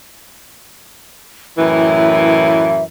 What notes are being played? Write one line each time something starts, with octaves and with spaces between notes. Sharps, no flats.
F#2 A2 E3 E5